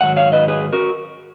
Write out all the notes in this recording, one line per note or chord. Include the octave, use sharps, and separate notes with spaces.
G#2 D#3 F#3 F#5
C#5 F5
B4 D#5
G#4 B4
F#4 A#4